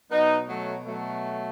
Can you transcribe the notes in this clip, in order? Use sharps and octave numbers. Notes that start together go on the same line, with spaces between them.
B2 F#3 B3 D#4
F#3 A3
F#3 A3